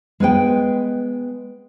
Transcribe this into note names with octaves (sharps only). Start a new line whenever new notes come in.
G#3 B3 B4 G5